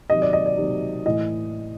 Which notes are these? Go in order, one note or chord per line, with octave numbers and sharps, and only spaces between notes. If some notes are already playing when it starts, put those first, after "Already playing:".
C3 D#3 F#3 D#5
D5
D#5
D5
C3 D#3 F#3
A2 E3 D#5